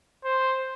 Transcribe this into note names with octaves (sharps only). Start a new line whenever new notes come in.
C5